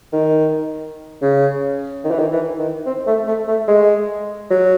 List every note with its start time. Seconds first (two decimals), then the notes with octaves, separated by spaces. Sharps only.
0.13 D#3
1.22 C#3
2.04 D#3
2.11 E3
2.19 D#3
2.32 E3
2.59 D#3
2.86 C4
3.07 A3
3.27 A3
3.48 A3
3.68 G#3
4.50 F#3